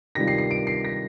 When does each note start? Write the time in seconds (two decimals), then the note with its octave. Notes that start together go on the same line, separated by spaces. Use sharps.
0.15 C3 D#3 G3 D4 F4 A#6
0.28 C7
0.38 C7
0.51 D7
0.67 C7
0.85 A#6